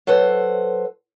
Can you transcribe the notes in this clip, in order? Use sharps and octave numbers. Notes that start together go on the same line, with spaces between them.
F#3 A4 B4 C5